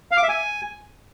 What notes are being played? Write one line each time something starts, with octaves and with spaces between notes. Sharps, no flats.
F5
D6
E5
G#5